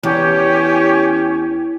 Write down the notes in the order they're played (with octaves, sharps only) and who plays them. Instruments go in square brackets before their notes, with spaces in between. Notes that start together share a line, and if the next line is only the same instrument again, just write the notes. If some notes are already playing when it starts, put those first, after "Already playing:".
[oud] E2 [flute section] C#4 G4